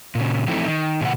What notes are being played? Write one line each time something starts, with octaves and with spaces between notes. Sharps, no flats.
A#2 C#3
E3 F3 A3 C4 D#4 E4
D#3
A#2 C#3 E3 F#5